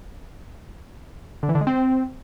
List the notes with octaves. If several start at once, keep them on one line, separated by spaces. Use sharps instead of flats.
D3
E3
D3
G#3
C4